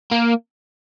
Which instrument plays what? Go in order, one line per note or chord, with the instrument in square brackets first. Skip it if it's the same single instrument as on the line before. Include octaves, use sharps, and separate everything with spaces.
[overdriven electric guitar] A#3